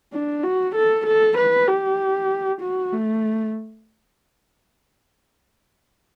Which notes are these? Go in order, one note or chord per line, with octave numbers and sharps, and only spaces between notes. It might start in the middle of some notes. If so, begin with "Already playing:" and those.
D4
F#4
A4
A4
B4
G4
F#4
A3